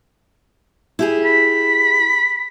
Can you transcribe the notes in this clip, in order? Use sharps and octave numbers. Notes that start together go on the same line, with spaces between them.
E4 G4 G#4
B5